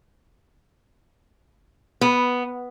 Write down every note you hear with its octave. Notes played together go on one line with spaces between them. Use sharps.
B3